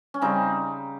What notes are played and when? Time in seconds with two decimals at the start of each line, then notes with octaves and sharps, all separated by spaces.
0.14 C#4
0.22 C#3 G3 C4 D#4